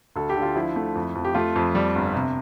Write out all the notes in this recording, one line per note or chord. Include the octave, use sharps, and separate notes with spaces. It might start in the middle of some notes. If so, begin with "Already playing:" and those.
D2 A4
G4
D3
F4
F3 E4
A3
F2
F2
G4
A3 F4
F2
G3
G1
C3